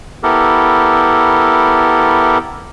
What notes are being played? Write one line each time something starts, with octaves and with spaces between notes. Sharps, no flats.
B3 E4 G4 A4 A#4